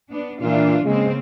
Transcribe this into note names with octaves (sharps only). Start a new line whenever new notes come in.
B3 D4
A#2 E3 D4 F4
C#3 G#3 A#3 C4